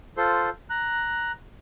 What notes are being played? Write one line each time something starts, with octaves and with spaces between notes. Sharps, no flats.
F4 A4 C5 C6
A#5 F#6